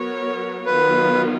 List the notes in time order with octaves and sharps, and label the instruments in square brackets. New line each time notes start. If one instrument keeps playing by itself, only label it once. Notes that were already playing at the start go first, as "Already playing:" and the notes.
Already playing: [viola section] F#3 B3 F#4 A#4 C#5
[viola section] D#3 F#3 B3 F4 [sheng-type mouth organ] B4